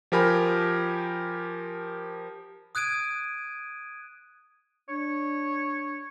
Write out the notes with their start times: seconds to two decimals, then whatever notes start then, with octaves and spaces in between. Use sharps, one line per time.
0.12 F3 G4 A#4 G#5 B5
2.75 D#6 F#6 G#6 D7 D#7
4.89 D4 C#5